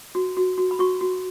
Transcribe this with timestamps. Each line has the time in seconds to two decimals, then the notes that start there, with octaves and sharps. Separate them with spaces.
0.15 F#4
0.37 F#4
0.58 F#4
0.71 B5
0.79 F#4 C#6
1.01 F#4